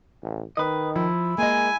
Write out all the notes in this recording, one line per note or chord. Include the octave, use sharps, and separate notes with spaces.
A1
D#3 B4 D#5
F3 E4
G#3 A#3 D#5 G#5